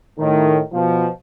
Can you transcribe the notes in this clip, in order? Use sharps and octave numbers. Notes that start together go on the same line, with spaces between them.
A2 D#3
B2 F3